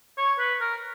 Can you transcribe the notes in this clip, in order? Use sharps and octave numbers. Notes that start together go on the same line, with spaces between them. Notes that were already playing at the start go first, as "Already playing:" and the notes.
C#5
B4
A#4